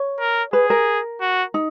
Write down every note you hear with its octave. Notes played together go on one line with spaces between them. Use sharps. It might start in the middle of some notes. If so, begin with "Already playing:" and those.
Already playing: C#5
A#4
G#4 B4
A#4
F#4
D#4